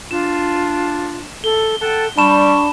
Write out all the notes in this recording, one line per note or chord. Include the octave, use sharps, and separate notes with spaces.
D4 F4 E7
A4 G7
A4 F#5 G5 A5
G3 D4 A5 B5 C#6 E7